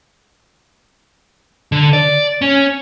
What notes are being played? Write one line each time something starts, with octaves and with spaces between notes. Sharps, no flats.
D3
D5
C#4